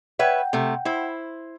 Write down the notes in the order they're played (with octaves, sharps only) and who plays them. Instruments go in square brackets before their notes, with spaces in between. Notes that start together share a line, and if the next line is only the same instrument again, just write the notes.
[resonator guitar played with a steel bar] B4 C#5 E5 [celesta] F#5 G5 G6
[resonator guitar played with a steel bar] C3 A3
E4 C5